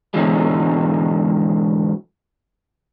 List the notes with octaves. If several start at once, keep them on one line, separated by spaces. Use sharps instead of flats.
G#2 B2 D3 E3 F#3 G#3